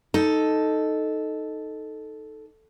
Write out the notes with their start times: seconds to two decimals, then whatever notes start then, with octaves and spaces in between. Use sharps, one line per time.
0.14 D#4 A4